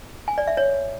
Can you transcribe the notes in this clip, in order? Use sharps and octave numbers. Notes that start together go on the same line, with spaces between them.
G#5
D5
E5
C#5